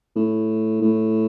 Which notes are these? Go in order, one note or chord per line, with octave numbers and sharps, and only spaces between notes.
A2
A2